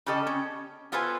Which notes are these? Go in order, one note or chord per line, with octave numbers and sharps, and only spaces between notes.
C#3 C#4 G4 A4 D#5 A5
C#4
B3 F4 A4 B4 C5 G#5